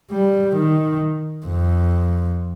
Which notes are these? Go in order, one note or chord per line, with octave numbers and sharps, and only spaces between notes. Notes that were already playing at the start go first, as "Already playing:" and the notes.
G3
D#3
F2